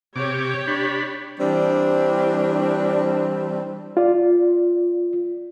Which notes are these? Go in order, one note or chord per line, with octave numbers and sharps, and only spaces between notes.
C3 G4 C#5 D6
D4 B5
E3 G3 C4 D4
F4 D5